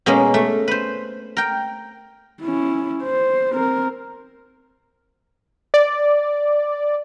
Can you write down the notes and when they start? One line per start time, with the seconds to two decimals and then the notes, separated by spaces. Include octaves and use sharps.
0.06 B2 G#3 A#3 C#4
0.34 A3
0.68 B4 C5
1.37 A#4 G5
2.42 C#4 E4
3.03 C5
3.51 C4 A#4
5.74 D5